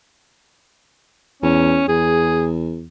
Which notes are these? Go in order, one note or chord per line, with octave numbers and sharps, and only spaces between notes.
E2 C#4
E2 G#4